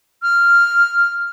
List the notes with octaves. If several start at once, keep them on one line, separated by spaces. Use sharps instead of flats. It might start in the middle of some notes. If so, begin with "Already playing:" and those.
F6